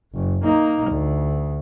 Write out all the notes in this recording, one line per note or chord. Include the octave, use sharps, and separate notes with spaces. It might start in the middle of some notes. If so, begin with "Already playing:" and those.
F#1
A#3 D#4
D2